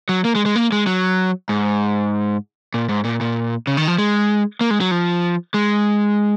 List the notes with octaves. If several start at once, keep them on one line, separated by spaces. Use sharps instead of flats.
F#3
A#3
G#3
G#3
A#3
G#3
F#3
G#2
A#2
G#2
A#2
A#2
C#3
D#3
F3
G#3
A#3
G#3
F#3
F3
G#3